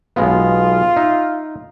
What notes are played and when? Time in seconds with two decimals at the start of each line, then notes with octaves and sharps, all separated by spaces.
0.16 B1 G#3 B3 F4
0.96 D#4 E5